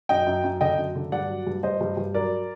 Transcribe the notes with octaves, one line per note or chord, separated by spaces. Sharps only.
F#2 D#5 G5
F#2
F#2
D3 D#5 G5
F#2
D3
G2 D5 F#5
F#3
G2
G2 C5 D#5
G2
G2
F#3 A#4 D5